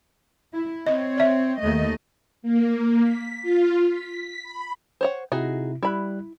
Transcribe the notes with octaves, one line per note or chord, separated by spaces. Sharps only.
E4
C4 C#5 D#5
D5 E5
D#2 A3 D#5
A#3
B6
F4
B6
B5
C5 C#5 F#5
C3 D#4 E4 F#4 G#4
G3 E4 B5 F#6